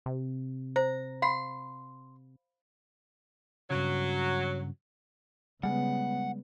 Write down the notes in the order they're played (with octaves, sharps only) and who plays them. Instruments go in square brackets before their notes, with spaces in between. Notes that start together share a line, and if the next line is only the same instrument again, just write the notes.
[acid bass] C3
[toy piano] C5 [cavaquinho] A#5
[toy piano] F5 B5 [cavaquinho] C6
[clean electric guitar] G2 C#3 [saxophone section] F#3
[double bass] C#3 B3 [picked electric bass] G3 G#3 [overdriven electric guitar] F#5